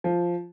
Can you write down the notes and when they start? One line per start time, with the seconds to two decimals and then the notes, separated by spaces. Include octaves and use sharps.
0.04 F3